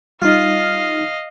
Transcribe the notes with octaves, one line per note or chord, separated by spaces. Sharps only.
G3 D#4 F4 D#5 F5